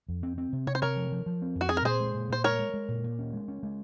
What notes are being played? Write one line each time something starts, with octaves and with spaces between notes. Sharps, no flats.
F2
C4
C4
C3
C3 C#5
C5
C3 A#4 C#5
F3
F3
F3
C4
F2
F#4
C4 G#4
A#4
A#2 G#4 C5
G#3
A#2
A#2 C5
G#3 A#4 C#5
G#3
G#3
A#2
A#2
C#4
G#3
C#4
G#3